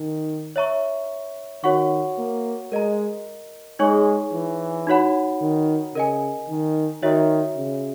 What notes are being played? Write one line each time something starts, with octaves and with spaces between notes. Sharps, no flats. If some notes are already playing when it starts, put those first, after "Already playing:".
Already playing: D#3 D#4
C#5 E5 A#5 C#6
D#3 F#4 C#5 F#5 C#6
A#3
G#3 A#4 D#5 A#5
G#3 D#4 G#4 C#5 G#5 C#6
E3
D#4 F#4 C#5 F#5 B5
D#3
C#3 A#4 D#5 G#5
D#3
D#3 F#4 C#5 E5
C#3